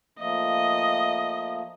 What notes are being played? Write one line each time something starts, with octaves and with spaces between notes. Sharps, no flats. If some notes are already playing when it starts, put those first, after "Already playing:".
F3 A3 A#3 D#5